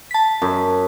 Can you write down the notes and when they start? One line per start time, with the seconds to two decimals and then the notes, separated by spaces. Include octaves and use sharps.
0.11 A5 B6
0.42 F#2